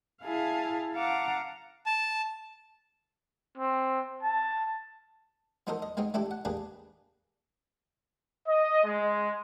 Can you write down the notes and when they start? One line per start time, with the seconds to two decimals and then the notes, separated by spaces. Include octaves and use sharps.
0.23 E4 G#4 F5 G#5 A5
0.95 F5 F#5 A5 A#5 D6
1.86 A5
3.57 C4
4.23 A5
5.67 F#3 B3 D#4 A4 A#4 C5
5.82 D#5
5.97 G#3 B3 C4 D#4
6.14 A3 D4 E4 G4
6.31 F#5
6.45 A#3 D4 G4 G#4 B4
8.47 D#5
8.84 G#3